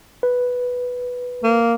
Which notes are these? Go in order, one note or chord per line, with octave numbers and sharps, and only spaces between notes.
B4
A#3